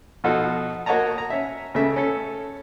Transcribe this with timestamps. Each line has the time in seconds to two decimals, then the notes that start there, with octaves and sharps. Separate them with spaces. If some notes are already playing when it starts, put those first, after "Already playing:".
0.24 B2 F3 D#4 F4 F#4 A4
0.86 A#3 F#4 C#5 D#5 A5 A#5
1.18 A#5
1.30 C#4 E5
1.74 C#2 C#3 A3 E5
1.96 C#4 A4